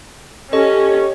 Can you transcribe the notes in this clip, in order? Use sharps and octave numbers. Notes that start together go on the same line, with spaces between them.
C#4 G4 A4 D#5